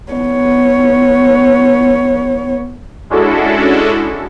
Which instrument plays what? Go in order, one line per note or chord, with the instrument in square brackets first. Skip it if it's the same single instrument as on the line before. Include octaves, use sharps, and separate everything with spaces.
[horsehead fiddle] B3 C#5
[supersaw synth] G#3 C#4 D4 E4 F#4 A4